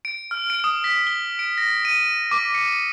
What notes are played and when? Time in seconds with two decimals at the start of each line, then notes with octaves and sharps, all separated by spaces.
0.05 D7
0.31 F6
0.50 D7
0.64 D#6
0.84 B6
1.07 G7
1.39 D7
1.58 A#6
1.85 D#7
2.31 D6
2.54 C#7